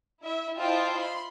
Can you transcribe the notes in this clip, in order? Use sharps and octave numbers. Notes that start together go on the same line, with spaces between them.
E4 E5
E4 F4 C5 D#5 G5 A5
B5 C6